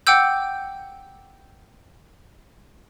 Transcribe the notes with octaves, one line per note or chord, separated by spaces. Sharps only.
F#5 G5 D6 E6 G6